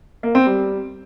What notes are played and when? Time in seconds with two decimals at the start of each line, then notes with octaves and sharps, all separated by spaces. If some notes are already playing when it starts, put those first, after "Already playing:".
0.23 A#3
0.35 C4
0.46 G3